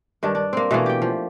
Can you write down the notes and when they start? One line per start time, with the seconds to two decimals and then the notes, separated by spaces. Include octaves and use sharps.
0.23 G2 D#3 D4
0.35 D4
0.53 A#3 C4
0.71 B2 E3 A3 A#3
0.86 G4 G5
1.02 F3